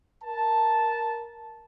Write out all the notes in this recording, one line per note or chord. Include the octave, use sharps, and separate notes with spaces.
A#4 A5